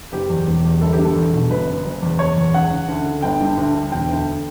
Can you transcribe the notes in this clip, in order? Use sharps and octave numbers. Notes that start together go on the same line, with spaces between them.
F#1 G4
E2
E1
E2
G1 A4
G4
G2
A4
E2
B2
G1 B4
F#2
F#1
E2
F#1 C#5
E2
C#2 F#5
C#3
D2
D3
G1 G5
G2
D2
D3
E1 G5
D2